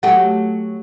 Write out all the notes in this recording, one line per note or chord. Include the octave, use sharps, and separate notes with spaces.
F#3 A3 G4 F#5